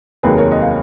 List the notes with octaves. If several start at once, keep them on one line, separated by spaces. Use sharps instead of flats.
F1 D#2 D#3 F#3 G#4 B4
A#4 C#5
D#5
F5